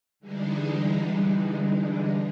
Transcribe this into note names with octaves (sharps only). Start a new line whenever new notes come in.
D3 E3 G3 G#3 D4 D#4